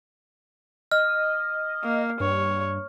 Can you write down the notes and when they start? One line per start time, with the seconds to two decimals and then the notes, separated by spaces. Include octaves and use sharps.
0.92 D#5 F6
1.83 A#3
2.20 G2 C#5